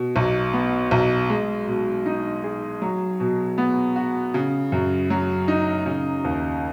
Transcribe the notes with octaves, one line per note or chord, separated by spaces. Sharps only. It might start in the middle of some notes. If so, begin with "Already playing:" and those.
Already playing: B2
B1
B3
B1
G#3
B2
D#4
G#4
F#3
B2
B3
F#4
C#3
F#2
F#3
D#4
C#3
D#2